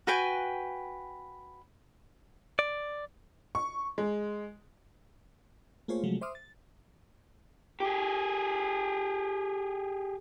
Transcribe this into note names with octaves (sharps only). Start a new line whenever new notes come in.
F#4 B4 G5 G#5
D5
C#6
G#3
A3 A#3 F4 G#4 C5 C#5
C3 F3 F#3 G#3 A3
C5 E5 C6 D6 D#6 F6
A6
G4 G#4